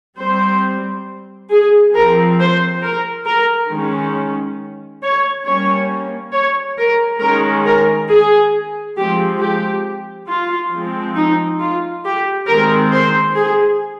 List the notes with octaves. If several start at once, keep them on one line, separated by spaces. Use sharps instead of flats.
G3 C4 C5
G#4
F3 C4 A#4
C5
A#4
A#4
D#3 G#3 C#4
C#5
G3 A#3 C#4 C#5
C#5
A#4
D#3 G#3 C#4 A#4
A#4
G#4
F3 G#3 C4 G4
G4
F4
F3 G#3 C4
D#4
F4
G4
D#3 G#3 C4 A#4
C5
G#4